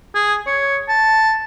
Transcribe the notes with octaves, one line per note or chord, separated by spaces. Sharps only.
G#4
C#5
A5